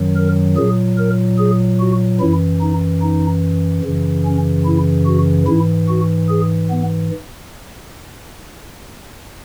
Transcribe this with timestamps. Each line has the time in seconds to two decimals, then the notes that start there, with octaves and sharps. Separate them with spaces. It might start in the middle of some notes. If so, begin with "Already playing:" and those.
Already playing: F#2 D#3 F#3
0.16 A#4
0.57 A#2 F#3 G#4
0.98 A#4
1.39 G#4
1.80 F#4
2.21 F#2 E3 E4
2.61 D#4
3.02 D#4
3.84 F#2 C#3 E3
4.25 C#4
4.66 E4
5.06 F#4
5.47 G#2 E3 E4
5.89 F#4
6.29 G#4
6.70 B3